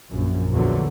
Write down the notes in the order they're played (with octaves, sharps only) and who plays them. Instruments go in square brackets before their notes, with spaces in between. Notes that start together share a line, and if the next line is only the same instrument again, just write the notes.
[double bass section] A#1 F#2
A#1 E2 A#2 D3 F#3